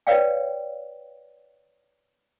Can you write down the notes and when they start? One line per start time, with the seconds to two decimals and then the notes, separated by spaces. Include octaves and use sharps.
0.07 B4 C#5 D5 F5 G5